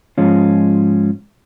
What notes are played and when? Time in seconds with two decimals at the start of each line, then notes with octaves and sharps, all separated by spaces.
0.18 G#2 F3 G#3 C#4 F4